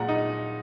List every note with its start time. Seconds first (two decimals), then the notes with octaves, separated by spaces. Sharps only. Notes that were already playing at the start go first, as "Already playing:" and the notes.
Already playing: A#2 G#3 F#5 A#5
0.09 D#4